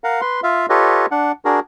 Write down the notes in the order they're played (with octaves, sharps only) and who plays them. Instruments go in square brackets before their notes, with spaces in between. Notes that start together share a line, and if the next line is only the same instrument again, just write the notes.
[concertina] A#4 F5 F#5
B4 C6
F4 E5 F5
F4 G4 A4 B4 C#5 D#5
D4 F#5
D4 F#4 G#4 A#4